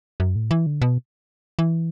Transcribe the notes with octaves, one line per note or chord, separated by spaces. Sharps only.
F#2
A2
E3
D3
B2
E3